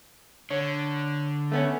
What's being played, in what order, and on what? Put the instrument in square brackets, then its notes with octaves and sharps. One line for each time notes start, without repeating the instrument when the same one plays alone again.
[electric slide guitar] D3 [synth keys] C#5
[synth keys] A3 B3 C#4